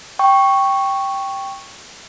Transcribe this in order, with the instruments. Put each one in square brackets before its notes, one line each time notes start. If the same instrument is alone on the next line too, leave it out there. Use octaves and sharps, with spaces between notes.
[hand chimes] G5 C#6